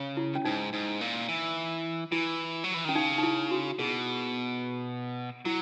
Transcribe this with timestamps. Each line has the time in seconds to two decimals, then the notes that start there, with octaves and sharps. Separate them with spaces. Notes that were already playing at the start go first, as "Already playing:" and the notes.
Already playing: C#3
0.17 E4
0.35 C#4
0.45 G#2 D#4
0.73 G#2
1.01 A#2
1.28 E3
2.12 E3 E4
2.64 F#3
2.74 E3
2.85 D#3 C#4
2.95 C#3 D#4
3.18 D#4
3.23 E4
3.51 F#4
3.79 B2 G#4
5.45 F#3 E4